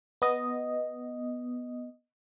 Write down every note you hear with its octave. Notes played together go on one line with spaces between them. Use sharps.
B3 D#5